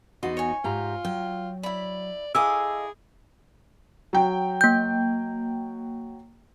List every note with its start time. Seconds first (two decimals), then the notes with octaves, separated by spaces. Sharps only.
0.23 E2 B3 D#4 F#4 C6
0.37 C#5 G#5
0.64 G#2 F4 G4 A#5
1.05 F#3 G5
1.63 E4 D5 B5
2.35 E4 G#4 A4 D#5 F5 G#5 D6 E6
4.13 F#3 G5
4.61 A#3 G6